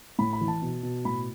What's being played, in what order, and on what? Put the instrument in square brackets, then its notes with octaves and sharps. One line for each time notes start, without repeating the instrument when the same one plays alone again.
[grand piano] A2 B5
B5
E3
A5
B2
B2
A2 B5